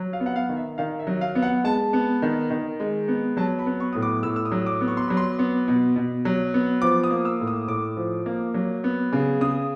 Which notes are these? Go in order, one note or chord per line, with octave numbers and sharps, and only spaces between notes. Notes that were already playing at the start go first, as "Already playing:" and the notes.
Already playing: F#3
F5
B3
F#5
F5
D#3
E5
D#3 F5
E5
F#3
F5
B3
F#5
G#3 A5
B3
D#3
D#3
G#3
B3
F#3 A5
B5
B3
C#6
A2 D#6
D6
A2 E6
E6
D#6
F#3
D6
B3
C#6
C6
F#3 B5
C6
B3
B2
B2
F#3
B3
F3 D6
D#6
A#3
E6
A2
D#6
A2 D6
F3
A#3
F#3
B3
C#3
C#3 D#6